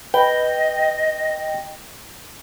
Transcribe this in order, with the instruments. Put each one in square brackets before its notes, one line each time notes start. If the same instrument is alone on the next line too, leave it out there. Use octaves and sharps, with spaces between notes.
[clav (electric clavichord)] B4 [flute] D#5 [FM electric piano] G5